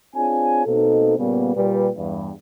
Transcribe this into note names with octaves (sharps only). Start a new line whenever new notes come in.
C4 D4 F4 G#4 C#5 G#5
B2 A#3 C4 D#4 A4
A#2 C#3 G3 A#3 B3
A#2 G3 B4
E2 G2